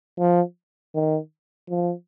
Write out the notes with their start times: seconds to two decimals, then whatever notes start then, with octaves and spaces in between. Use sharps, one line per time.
0.18 F3
0.95 D#3
1.70 F3